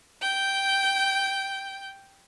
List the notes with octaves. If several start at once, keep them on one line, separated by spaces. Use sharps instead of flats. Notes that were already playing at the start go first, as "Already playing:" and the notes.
G5 G6